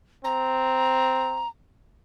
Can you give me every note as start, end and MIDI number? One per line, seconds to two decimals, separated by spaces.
0.24 1.45 60
0.24 1.48 82